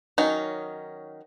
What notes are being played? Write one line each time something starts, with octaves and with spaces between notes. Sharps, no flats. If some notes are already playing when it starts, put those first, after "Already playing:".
D#3 F#3 C#4 D#4